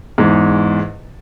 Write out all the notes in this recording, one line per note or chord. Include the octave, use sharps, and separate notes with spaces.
E2 G#2